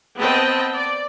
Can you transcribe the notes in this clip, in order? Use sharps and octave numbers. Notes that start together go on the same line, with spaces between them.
B3 C4 D#5 G5 A5
D5